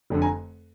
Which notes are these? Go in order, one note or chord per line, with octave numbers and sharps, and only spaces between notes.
F1 F2 D3
G#5 A#5